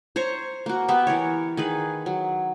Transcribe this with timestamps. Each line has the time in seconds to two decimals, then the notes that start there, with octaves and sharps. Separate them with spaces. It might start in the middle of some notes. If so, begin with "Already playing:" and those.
0.16 C5 C#5 A#5 C#6
0.66 A#3 F#4
0.88 B3 G4 E5
1.07 E3 A#4 C#5
1.57 D#3 G#4 B4
2.06 F#3